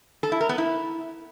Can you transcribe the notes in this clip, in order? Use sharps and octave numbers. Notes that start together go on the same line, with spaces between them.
A4
E4
A#4
B3
E4